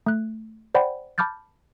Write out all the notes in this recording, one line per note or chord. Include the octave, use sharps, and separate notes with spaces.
A3 F#6
C5 D5 F#5 G5 B5
A5 B5 D6 F6 G6 A6